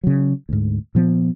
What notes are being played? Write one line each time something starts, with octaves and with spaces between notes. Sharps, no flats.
C#3 F#3
D2 G#2
A#2 F3 B3